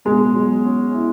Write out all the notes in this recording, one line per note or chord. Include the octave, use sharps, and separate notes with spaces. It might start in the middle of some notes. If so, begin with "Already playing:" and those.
B2 G#3
F#3
C#4
E4